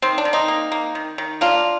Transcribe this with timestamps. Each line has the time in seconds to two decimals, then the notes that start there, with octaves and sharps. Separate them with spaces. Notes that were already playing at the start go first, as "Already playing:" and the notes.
0.02 D#3 C4
0.18 D4
0.25 D#3
0.33 C4 D#4
0.48 A#3
0.72 A#3
0.95 D#3
1.18 D#3
1.41 A#3 D4 F4